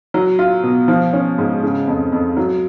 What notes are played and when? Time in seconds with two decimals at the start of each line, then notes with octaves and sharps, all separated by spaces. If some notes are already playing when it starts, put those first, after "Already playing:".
0.14 F#3
0.39 F4
0.64 B2
0.88 F3
1.13 C#4
1.38 G#2
1.63 C#3
1.88 F2
2.12 F2
2.37 F#3